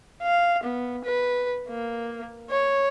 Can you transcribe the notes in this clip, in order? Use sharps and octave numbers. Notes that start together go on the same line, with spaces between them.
F5
B3
B4
A#3
C#5